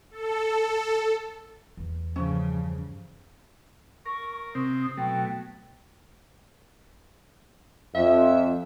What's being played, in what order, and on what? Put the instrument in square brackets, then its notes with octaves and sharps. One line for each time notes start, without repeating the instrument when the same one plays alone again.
[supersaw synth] A4
[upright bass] E2
[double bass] G2 C#3 [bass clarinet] F3 [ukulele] C#4
[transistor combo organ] A#4 [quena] C#6
[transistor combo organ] C3 C4 [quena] D#6
[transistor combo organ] B2 F#3 A3 [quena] G5
[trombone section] F2 [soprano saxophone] E5